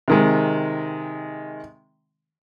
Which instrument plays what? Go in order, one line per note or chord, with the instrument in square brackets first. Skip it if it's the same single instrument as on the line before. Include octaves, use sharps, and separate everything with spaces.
[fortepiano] C3 D#3 G#3